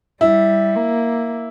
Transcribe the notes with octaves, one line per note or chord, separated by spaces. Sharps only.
G3 E4
A#3